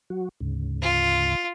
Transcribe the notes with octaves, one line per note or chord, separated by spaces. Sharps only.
F#3 F#4
D2 G#2 C#3
F4